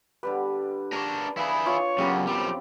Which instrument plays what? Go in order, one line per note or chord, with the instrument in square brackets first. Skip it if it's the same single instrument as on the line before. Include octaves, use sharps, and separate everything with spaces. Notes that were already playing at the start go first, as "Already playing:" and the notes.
[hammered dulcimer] D3 G3 G4 [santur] B4
[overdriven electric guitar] D4 A#4 [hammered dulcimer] G#5 C#6
[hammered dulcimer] D4 B4 B5 [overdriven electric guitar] E4 G#4 [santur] F5
[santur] F4 [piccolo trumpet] C#5
[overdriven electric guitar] F#2 C#3 [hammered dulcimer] A#3 B3 F4 [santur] G4
[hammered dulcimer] F#2 C4 B5 [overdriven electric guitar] F3 G3 [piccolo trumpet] D6